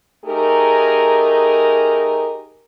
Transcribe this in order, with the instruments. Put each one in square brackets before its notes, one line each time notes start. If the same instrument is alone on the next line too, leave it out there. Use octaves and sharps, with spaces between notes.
[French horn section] A3 D#4 G4 G#4 A#4